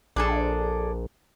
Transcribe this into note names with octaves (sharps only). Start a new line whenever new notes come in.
A#1 D4 G#4 A4